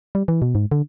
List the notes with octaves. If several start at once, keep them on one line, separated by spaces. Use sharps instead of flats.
G3
E3
B2
G#2
D3